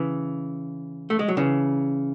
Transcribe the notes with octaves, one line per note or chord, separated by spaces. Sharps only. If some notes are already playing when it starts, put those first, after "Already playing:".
Already playing: C#3 E3
A3
G#3
F#3
C#3 E3